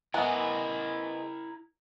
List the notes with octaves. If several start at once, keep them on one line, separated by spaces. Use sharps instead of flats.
E3 G#3 B3 E4 A#4